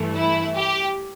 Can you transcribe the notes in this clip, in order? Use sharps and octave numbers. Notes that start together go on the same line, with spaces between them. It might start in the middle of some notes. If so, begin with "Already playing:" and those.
Already playing: G2 E3 A3
E4
G4